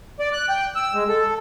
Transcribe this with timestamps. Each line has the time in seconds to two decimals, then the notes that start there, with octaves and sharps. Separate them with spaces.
0.20 D5
0.33 F#6
0.49 G5
0.76 E6
0.94 G#3
1.09 A4